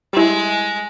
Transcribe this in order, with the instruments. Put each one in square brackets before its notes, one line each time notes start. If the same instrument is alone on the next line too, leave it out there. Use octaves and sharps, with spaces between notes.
[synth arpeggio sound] G3 E4 [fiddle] G#3